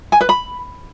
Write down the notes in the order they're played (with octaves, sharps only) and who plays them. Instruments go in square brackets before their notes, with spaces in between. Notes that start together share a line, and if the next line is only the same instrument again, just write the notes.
[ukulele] G#5
B4
B5